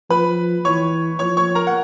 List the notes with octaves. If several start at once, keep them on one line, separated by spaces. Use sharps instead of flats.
F3 B4 B5
E3 C#5 C#6
F3 C#5 C#6
C#5 C#6
A#4 A#5
F#5